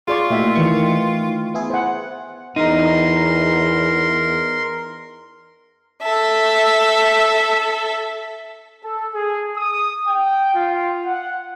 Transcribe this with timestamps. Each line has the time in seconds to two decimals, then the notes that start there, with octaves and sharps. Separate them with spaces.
0.08 F4 G#4 D5 C#6
0.30 A#2 A3 E4 F#4 E5 G5
0.56 D#3 E3 C#6
1.54 B3 E4 G#4
1.70 C5 F#5
2.56 E2 D#4 A#4 C6
6.02 A4 E5
8.83 A4
9.13 G#4
9.56 D#6
10.06 G5
10.54 F4
11.05 F#5